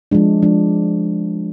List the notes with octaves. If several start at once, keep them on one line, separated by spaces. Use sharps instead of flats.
F3 G#3 D4
F3 G#3 D4